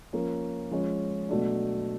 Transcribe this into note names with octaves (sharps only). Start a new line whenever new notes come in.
F3 A#3 C#4
F3 G#3 C#4
B2 F#3 A3 D4